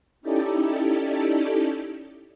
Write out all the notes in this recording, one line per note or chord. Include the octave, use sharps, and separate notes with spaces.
C#4 D#4 E4 G4 A4 D5